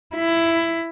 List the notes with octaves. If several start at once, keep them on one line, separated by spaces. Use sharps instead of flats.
E4